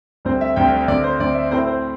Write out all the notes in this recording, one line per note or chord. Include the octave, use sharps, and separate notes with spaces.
D2 D3 G3 C4 C5
E5
D2 D3 G3 C4 G5
D2 D3 C4 D5
C5
D2 D3 C4 D5
E5
A2 A3 C4 C5
C5